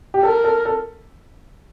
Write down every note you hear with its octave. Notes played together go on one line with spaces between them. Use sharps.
G4
A4 A#4
A4
A4